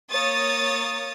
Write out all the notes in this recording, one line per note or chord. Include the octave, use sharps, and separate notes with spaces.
A#3 C#5 D#6 A6